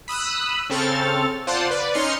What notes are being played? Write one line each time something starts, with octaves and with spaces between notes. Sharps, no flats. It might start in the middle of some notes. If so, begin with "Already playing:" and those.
B5 D#6 E6 F#6
C#3 C4 A4 C#6 F6 A6
F4 C5 D5 F#5 A5 C6
B4 D5
C#4 D#4 C6 F6 C#7